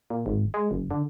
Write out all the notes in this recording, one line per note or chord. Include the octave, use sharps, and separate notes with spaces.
A#2
G#1
G#3
F#1
D3